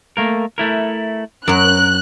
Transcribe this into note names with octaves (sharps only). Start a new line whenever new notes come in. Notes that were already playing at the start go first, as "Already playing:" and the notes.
A3 A#3 A#4
A3 E4 A#4
F#2 F#3 A#4 F#6